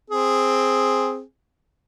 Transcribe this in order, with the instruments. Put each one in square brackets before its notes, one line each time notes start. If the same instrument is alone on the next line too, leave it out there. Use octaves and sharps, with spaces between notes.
[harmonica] C4 G#4